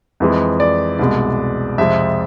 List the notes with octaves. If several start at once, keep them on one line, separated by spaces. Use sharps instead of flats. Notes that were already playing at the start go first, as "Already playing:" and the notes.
F2 E3 G#3
D5
C2 B2 G#3
F2 C3 F3 G#3 E5